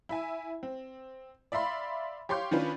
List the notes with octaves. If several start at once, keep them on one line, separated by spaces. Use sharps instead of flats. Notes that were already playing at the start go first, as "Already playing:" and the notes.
E4 E5 G#5
C4
D5 E5 F5 B5 C6
G4 C#5 F5 C6 D6 G6
D#3 C#4 D4 F4 B4